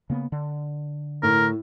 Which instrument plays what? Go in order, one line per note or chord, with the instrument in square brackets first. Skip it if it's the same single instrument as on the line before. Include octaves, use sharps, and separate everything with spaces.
[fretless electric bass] C#3 A#3 B3
D3
[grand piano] A2 [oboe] A#4